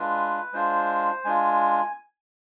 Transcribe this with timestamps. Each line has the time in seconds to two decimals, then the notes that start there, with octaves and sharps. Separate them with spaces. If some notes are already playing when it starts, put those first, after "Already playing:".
Already playing: G#3 D4 F4 B4
0.53 G#3 D4 F4 C5
1.24 G#3 D4 F4 G#5